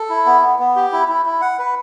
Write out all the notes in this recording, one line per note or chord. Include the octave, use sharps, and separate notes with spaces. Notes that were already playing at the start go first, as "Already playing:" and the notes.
Already playing: A4
E4
B3
B3
B3
G4
E4
E4
E4
F#5
B4